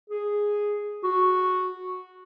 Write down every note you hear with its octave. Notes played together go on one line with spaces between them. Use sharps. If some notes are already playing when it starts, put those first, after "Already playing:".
G#4
F#4